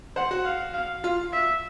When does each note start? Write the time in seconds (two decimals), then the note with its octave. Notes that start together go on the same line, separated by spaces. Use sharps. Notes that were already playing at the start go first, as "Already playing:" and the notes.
0.16 C5 F#5
0.31 F#4
0.45 F5
0.74 F5
1.04 F4 F5
1.32 E5